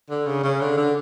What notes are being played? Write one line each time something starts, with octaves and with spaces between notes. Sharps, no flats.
D3
C#3
C#3
D3
D3